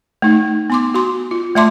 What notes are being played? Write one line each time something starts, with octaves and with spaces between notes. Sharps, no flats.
A3 D#4
B3 C6 D6
F#4 C6
F4
A3 D5 E5 A5 C6 D6